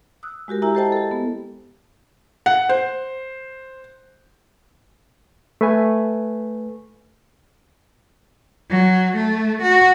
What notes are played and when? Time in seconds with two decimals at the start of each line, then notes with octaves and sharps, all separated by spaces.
0.23 D#6 E6 F#6
0.48 G#3 F#4 G4 A#4
0.62 E4 G4 A#4 E5 G#5 A#5
0.75 G4 A4 C5 D#5 G5 A5
0.92 G4 A4
1.11 B3
2.46 F#5
2.69 C5
5.61 A3 B4 G#5
8.70 F#3
9.16 A3
9.62 F#4